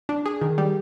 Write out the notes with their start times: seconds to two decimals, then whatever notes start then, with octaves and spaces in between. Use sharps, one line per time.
0.09 D4
0.26 G#4
0.41 D#3
0.58 G3